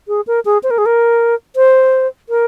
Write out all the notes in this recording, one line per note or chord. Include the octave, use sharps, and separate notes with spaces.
G#4
A#4
G#4
C5
A#4
G#4
A#4
C5
A#4